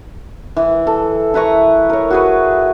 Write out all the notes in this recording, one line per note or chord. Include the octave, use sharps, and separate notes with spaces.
E3
A4
E4 B4 A#5 C#6
A#4 C#5
F#4 G#4 B4